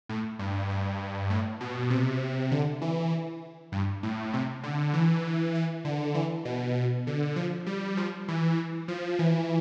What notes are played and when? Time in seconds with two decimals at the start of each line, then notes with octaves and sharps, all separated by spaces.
0.09 A2
0.39 G2
0.70 G2
1.30 A2
1.61 B2
1.90 C3
2.52 D3
2.82 E3
3.72 G2
4.03 A2
4.33 C3
4.63 D3
4.94 E3
5.55 E3
5.85 D3
6.15 E3
6.45 B2
6.75 B2
7.07 D3
7.36 F3
7.66 G3
7.97 F3
8.28 E3
8.88 F3
9.19 E3